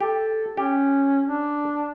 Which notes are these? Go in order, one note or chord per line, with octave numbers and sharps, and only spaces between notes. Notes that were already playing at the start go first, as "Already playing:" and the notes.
G4 A4
C#4 G4
D4